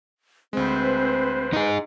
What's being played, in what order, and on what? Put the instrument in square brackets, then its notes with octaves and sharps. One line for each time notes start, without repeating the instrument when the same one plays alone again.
[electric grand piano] D2 G#3 [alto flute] C4 [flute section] B4 C5
[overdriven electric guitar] D#4 G#4